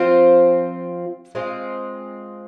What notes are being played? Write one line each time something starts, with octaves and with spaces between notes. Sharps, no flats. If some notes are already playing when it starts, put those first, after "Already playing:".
Already playing: F3 C4 F4
G#3 C4 F4